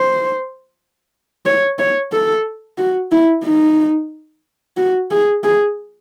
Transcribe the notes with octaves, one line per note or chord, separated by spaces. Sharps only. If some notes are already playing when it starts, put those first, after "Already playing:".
Already playing: C5
C#5
C#5
A4
F#4
E4
D#4
F#4
G#4
G#4